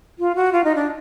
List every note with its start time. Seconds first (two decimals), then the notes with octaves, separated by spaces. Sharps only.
0.19 F4
0.35 F#4
0.52 F4
0.64 D#4
0.75 D4